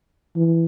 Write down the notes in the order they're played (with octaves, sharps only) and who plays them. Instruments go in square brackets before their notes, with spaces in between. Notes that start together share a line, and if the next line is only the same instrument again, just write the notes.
[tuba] E3